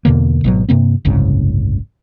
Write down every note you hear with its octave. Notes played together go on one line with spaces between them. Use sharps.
E2 B2 D3 A#3
G#1 B2 F#3
G2 C3 A#3 C4
F#1 C2 G#2 C#3